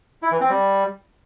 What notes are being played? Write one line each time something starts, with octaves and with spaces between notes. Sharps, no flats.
E4
E3
C4
G3